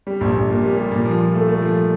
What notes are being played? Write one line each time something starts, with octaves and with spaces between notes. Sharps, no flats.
G3
A#1
A#1
A#2
G3
G3
A#2
F3
F3
A3
A3
F3